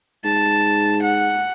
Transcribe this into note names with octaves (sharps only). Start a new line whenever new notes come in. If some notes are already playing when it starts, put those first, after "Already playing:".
G#2 A5
F#5